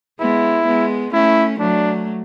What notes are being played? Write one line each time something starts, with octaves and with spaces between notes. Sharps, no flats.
G#3 B3 E4
G#3 B3
A3 C#4 E4
F#3 A3 D4